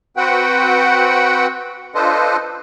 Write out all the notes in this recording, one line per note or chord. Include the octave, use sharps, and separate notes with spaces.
C4 F#4 B4 F#5 G5
D4 F4 A4 B4 C5 D#5